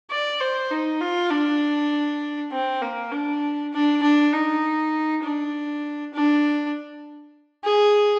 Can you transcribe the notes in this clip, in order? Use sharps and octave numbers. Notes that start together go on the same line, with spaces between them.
D5
C5
D#4
F4
D4
C4
A#3
D4
D4
D4
D#4
D4
D4
G#4